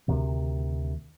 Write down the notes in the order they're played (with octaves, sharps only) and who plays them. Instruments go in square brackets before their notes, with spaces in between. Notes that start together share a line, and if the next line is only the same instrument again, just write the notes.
[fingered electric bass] D2 C3 D#3